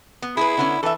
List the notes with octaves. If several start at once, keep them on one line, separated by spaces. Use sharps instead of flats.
B3
E4 G#4 B4
D3 B3 C#4
E3 A4 E5